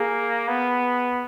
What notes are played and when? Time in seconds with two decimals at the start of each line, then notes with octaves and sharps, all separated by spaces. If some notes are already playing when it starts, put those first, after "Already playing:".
Already playing: A#3 G#4
0.48 B3